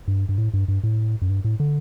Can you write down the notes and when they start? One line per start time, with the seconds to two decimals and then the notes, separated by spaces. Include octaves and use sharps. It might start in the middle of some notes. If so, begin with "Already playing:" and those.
0.08 G2
0.29 G2
0.38 A2
0.54 G2
0.68 G2
0.84 A2
1.22 F#2
1.29 G2
1.45 A2
1.60 D3